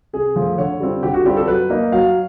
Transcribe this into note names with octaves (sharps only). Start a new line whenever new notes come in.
C3 G#4
F3 A3
D3 C#5
G3 C4 F4
D3 G4
F#4
G3 C4 F4 G4
A4
F#3 B4
A#3 D#4
F#3 F5